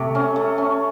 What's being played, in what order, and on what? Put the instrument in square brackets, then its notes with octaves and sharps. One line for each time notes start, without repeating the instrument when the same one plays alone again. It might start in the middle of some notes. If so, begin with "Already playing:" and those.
Already playing: [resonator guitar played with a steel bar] C3 [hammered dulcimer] A3
[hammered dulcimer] C#4
A3
C#4